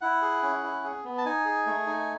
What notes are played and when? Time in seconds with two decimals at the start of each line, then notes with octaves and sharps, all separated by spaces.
0.01 E4 F#5
0.22 G#4
0.43 C#4
0.63 E4
0.84 G#4
1.04 B3
1.18 A5
1.26 D#4 G#5
1.45 G#4
1.66 A3
1.87 D#4